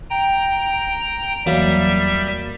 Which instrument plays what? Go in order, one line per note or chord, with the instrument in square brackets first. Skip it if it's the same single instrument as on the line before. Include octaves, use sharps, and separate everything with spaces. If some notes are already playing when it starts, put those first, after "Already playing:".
[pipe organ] G5 A#5
[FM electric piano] E2 F#3 A#3 [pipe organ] G3 E5